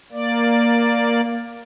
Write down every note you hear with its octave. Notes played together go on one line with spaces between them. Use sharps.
A#3 D5